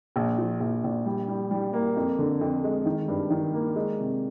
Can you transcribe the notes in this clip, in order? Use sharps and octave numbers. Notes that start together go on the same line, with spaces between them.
A#1
F3
A#1
A#1
G3
G3
G3
A#3
F2
D3
F2
G#3
D#3
G2
D#3
A#3
G#3
C3